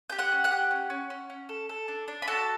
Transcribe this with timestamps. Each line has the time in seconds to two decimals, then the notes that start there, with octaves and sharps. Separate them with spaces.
0.10 G4 G6
0.19 F#5 F#6
0.32 C#4
0.44 F#5 F#6
0.51 G4
0.71 C#4
0.90 C#4
1.10 C#4
1.30 C#4
1.49 A4
1.69 A4
1.88 D4
2.08 D4
2.22 B5
2.27 F#4 A4 A5